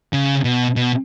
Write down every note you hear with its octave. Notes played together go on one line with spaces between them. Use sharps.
C#3
B2
B2